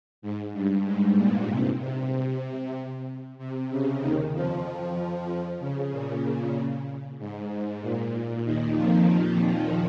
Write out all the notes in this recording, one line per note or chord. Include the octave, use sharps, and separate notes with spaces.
G#2
G2
G#2
A#2
C3
C3
C3
C#3
D#2 D#3
F2 F3
F2 F3
C#3
A#2
G#2
G#2
A#2
D#2 D#3
F2 F3